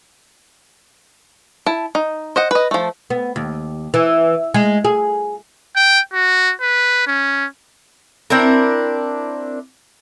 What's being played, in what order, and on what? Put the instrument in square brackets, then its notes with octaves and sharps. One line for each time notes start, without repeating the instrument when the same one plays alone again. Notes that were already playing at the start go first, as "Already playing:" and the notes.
[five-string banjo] E4 A5
D#4
C5 D#5 F#5
B4 D#5
F3 A3
[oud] B3
D#2
E3
G#3
G#4
[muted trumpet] G5
F#4
B4
C#4
[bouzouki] C4 D4 E4 A#4